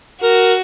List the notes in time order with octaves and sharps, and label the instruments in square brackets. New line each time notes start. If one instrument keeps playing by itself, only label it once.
[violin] F#4 [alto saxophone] A#4